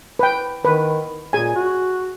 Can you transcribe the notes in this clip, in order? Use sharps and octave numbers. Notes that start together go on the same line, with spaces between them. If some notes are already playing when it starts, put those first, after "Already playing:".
B4 G5
D#3 B4
A#2 G#4 G#5
F#4